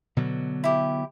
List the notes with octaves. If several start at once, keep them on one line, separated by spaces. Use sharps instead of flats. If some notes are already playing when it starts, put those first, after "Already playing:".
B2 D3 F#3
E4 G4